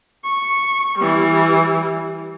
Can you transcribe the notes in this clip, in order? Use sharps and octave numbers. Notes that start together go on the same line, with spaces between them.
C#6
E3 G3